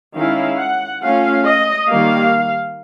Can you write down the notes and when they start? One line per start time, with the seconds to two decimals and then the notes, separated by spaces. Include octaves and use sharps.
0.16 D#3 G#3 C#4 E4 F5
0.59 F#5
1.03 A3 C#4 F4 F5
1.46 D#5
1.89 D#3 G3 A#3 F5